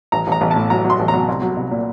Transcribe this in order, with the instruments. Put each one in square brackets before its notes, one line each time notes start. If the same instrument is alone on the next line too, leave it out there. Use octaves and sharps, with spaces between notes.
[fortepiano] A1 A#5
A1
A#5
A1
A5
A2
F#3 A#5
F#3
C6
A1
A#5
F#3
C2
F#3
C2
A#2